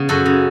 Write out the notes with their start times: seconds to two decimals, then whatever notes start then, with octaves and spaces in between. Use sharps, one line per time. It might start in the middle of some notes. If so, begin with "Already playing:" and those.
Already playing: C#3 B3
0.09 F#2 F#4 A4
0.26 C#3